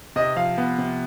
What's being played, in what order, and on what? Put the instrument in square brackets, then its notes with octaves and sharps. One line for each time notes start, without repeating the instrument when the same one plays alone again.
[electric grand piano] C3 [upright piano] D#5
[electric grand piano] F3 [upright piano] F5
[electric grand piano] B3
C3